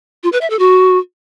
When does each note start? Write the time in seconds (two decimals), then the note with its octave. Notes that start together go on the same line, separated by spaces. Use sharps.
0.23 F4
0.32 B4
0.41 E5
0.50 A4
0.59 F#4